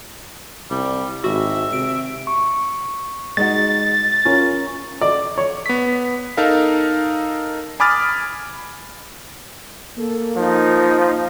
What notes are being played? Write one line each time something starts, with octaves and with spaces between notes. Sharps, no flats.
C2 G3
G#1 F#4 E5
C3 D7
C#6
G#3 D#4 F#4 A6
C#4 F4 A#4
D5
C#5
B3 B6
D#4 A4 A#4 F5
G#5 B5 D6 D#6 F6 A6
A#3 A4
F3 D#4